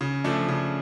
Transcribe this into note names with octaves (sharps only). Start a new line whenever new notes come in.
C#3
F3 A3 D4
C#3